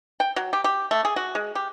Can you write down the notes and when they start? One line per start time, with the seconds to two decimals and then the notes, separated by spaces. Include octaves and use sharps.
0.20 G5
0.36 F#3
0.53 G4
0.64 G4
0.91 A3
1.05 G#4
1.16 F#4
1.35 G#3
1.55 G4